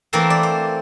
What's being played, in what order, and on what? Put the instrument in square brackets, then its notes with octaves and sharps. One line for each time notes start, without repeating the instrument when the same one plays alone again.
[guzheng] E3 A3 A#3 C4 A#4 C5
D5
C5